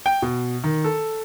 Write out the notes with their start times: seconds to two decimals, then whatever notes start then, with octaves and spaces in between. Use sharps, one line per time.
0.06 G5
0.22 B2
0.64 D#3
0.84 A4